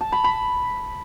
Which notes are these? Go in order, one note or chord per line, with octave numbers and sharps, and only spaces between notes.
A5
B5
B5